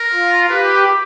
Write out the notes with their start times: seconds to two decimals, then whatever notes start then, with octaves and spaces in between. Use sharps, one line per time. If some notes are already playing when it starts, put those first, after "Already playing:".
Already playing: A#4
0.12 F4
0.50 G4 B4